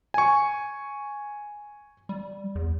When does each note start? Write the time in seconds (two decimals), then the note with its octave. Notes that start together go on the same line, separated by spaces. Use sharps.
0.14 G#5 C#6
2.09 G3
2.55 E2